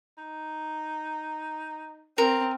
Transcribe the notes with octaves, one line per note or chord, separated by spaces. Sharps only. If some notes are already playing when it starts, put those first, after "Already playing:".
D#4
C4 A#4